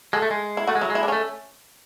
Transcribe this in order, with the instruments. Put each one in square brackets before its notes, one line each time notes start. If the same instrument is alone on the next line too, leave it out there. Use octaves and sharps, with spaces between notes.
[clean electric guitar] G#3 [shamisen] A4
[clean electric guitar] A3
G#3
[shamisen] E4
[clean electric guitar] A3 [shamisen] F#4
[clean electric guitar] G#3
[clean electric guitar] F#3 [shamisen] E4
[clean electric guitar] G#3
[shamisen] E4
D4
[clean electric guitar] A3 [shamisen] C#4